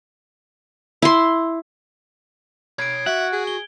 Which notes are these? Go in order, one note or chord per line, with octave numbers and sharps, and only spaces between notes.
E4 C6
C#5 B5 G#6 D7
F#4 E5 F#5
G#4
G7